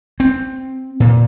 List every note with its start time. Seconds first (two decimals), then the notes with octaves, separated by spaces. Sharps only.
0.20 C4
1.00 A#2